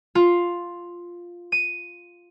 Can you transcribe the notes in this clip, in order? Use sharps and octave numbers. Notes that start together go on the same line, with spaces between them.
F4
D#7